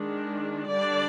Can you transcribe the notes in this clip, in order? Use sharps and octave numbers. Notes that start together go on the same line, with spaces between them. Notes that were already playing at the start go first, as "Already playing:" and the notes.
Already playing: D#3 G#3 D4
D3 G3 D4 D5